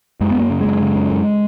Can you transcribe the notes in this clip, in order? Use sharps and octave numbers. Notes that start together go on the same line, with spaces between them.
F#2 G#3
B3
F#2
A#3
C#3
F#2 G#3
C#3
F#2
F#2